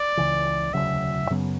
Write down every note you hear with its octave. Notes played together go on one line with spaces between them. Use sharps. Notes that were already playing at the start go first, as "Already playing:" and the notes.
Already playing: D5
C#2 C#3 E3
E1 D2 C#3 F#3 E5
F#2 C#3 F#3 B3